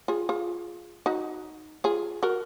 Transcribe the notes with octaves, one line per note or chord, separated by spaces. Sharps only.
F4 G#4
F4 G#4
D#4 F#4
F4 G#4
F#4 A#4